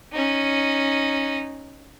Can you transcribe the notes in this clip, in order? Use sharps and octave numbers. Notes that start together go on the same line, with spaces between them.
C#4 D#4